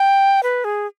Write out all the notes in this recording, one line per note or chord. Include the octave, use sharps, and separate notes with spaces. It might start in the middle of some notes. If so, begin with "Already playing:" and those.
Already playing: G5
B4
G#4